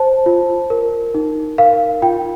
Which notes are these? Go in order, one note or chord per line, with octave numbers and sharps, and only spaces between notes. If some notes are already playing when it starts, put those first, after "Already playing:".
Already playing: C5 A5
F4
A#4
D#4
A#4 F5
F4 G5